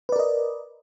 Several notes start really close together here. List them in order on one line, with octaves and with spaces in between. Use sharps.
B4 D5 A#4 D#5